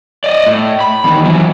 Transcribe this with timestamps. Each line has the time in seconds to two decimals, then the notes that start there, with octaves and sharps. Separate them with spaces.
0.24 D5 D#5
0.47 A2
0.80 B5
1.04 E2 D#3
1.24 E3 F#3